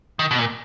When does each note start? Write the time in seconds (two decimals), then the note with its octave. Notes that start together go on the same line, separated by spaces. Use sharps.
0.19 D#3
0.31 B2
0.39 A#2